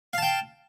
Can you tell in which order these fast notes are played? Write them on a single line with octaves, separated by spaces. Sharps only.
F5 A5 G5